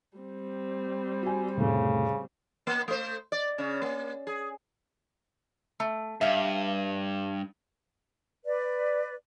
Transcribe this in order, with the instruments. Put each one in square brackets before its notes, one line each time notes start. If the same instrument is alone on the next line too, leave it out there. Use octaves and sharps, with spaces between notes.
[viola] G3 C4
[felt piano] F#4 G#5
[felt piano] F1 A2 [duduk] C#3
[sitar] A#3
A3 C5
D5
C#3 C#4
A#3
G#4
[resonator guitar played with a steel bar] A3
[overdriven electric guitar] G2 [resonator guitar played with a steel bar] E5 F5
[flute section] B4 D5